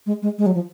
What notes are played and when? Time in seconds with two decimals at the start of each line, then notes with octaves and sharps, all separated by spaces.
0.06 G#3
0.22 G#3
0.38 G#3
0.46 F#3
0.55 F3